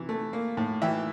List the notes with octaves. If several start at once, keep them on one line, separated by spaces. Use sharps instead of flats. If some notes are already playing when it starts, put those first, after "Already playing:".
Already playing: C3 E3
A3
A#3
A2
E3 E5 G5